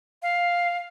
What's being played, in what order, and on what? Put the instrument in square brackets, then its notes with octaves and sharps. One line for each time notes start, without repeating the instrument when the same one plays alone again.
[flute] F5